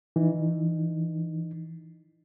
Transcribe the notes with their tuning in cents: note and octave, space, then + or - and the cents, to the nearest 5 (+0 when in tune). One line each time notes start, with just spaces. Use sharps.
E3 -5 D#4 -25